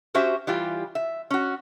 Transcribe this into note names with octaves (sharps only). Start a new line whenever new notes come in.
C#4 F#4 G4 C5 E5
E3 G3 F4 G4
E5
C#4 F#4